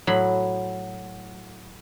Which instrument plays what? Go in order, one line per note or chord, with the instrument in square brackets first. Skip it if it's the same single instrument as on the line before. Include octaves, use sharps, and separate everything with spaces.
[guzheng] A2 F#3 B5 C6